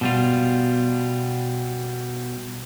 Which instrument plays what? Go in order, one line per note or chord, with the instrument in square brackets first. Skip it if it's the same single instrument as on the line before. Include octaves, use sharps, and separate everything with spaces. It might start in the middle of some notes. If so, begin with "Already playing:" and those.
[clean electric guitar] B2 G3 F4